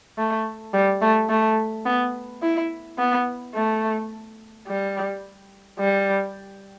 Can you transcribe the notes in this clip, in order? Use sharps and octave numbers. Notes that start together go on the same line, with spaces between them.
A3
G3
A3
A3
B3
E4
B3
A3
G3
G3